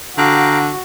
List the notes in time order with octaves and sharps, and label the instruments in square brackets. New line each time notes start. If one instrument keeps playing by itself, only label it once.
[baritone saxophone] D3 [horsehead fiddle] F#4 [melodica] F5 G5 A#5